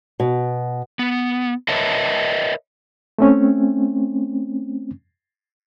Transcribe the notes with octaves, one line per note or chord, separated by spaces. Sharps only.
B2
B3
A#4 B4 C#5 D#5 E5 A5
A3 C4 C#4